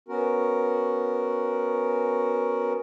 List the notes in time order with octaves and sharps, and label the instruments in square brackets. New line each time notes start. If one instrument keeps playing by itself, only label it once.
[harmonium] B3 C#4 F#4 A#4